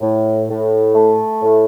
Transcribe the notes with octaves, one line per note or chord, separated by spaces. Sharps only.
A2
A2
A3
A2